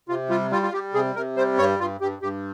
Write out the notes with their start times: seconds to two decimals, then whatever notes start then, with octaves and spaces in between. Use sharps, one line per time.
0.09 C3 F4
0.30 G3 F4
0.51 G3 F4
0.63 F4
0.73 G3 G4
0.94 C3 G#4
1.15 C3 A#4
1.37 G3 C5
1.58 G2 C#5
1.79 G2 F4
2.01 G2 G4
2.22 G2 G4